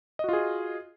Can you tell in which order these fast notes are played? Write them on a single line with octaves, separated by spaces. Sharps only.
D#5 F#4 F4 G#4